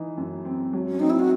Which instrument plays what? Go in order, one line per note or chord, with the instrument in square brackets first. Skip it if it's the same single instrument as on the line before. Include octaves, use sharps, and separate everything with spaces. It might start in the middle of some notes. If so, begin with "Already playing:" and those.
Already playing: [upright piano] E3 D#4
F#2
C4
F#3
[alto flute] C#4
[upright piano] C4 [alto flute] D#4
[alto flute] E4
F#4